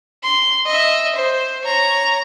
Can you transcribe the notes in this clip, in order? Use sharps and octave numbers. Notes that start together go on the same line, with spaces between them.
C6
D#5 E5
C5
C#5 A#5